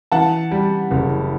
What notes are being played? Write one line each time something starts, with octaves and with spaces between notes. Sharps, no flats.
E3 F#5 A5
G3
F#1